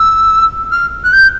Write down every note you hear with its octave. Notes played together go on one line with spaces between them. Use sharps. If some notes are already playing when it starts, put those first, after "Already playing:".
Already playing: E6
F6
F#6
G6